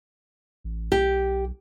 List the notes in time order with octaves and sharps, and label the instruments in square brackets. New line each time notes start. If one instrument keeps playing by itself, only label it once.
[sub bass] A1
[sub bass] B1 [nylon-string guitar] G4